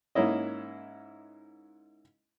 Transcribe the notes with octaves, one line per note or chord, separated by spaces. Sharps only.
G#2 A#3 C#4 E4 D#5